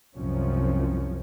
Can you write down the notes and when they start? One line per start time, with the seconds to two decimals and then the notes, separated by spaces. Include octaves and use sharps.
0.16 C2 F#2 C3 F3 C#4